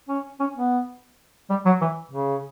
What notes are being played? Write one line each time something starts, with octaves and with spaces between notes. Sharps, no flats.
C#4
C#4
B3
G3
F#3
E3
C#3